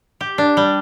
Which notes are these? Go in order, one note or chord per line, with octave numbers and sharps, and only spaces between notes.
G4
D4
G3